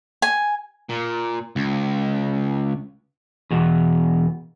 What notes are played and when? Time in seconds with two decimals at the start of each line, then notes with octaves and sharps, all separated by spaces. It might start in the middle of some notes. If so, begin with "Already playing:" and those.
0.22 G#5
0.90 A#2
1.56 C#2
3.51 E2 B2